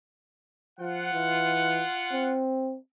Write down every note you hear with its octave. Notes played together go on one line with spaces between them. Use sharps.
F3 F4 F#5
E3
C4